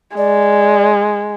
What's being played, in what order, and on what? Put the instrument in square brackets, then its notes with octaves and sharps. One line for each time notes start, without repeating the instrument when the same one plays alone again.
[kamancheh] G#3 [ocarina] D5